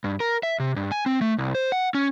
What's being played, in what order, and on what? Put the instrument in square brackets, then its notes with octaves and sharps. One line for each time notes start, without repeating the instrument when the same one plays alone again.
[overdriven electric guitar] G2
A#4
E5
C3
G2
G#5
C4
A3
C2
C5
F#5
C#4